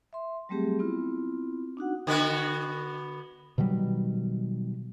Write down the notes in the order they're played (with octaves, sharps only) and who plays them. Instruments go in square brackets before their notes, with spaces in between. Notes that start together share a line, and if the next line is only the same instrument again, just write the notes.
[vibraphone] E5 C6
F#3 G3 A3 C4 G4 G#4
B3 C4 E4 F4
D4 D#4 F#4 F#5
[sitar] D3 B3 F#4
[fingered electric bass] B2 D#3 F#3 G3